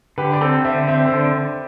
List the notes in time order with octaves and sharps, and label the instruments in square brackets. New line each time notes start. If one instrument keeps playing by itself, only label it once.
[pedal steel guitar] D3 [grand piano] G4 B4
[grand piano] D5
[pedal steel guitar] C4 [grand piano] A4 C5
[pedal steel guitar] D3 [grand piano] C5 E5
[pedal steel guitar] C4 [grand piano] C5 E5
[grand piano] A4 C5
[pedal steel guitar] D3